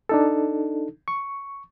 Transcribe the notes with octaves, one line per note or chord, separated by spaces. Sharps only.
D4 D#4 A4
C#6